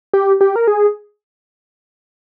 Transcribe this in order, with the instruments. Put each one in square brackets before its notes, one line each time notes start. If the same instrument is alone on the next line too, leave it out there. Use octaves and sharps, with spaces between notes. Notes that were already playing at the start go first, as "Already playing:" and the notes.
[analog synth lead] G4
G4
A#4
G#4